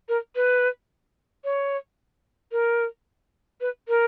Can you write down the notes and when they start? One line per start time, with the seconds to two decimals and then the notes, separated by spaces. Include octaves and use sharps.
0.09 A#4
0.36 B4
1.44 C#5
2.52 A#4
3.61 B4
3.88 A#4